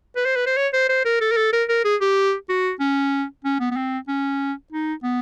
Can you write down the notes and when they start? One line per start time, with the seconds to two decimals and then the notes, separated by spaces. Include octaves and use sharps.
0.16 B4
0.25 C5
0.36 B4
0.46 C5
0.57 C#5
0.73 C5
0.89 C5
1.05 A#4
1.21 A4
1.32 A#4
1.37 A4
1.53 A#4
1.69 A#4
1.85 G#4
2.01 G4
2.49 F#4
2.80 C#4
3.45 C#4
3.60 B3
3.71 B3
3.77 C4
4.08 C#4
4.72 D#4
5.03 B3